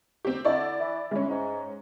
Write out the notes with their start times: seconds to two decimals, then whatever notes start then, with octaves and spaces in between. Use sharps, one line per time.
0.25 C4 G4
0.45 D3 E4 D5
0.80 E3
1.11 E3 G#3 C#4
1.29 G#2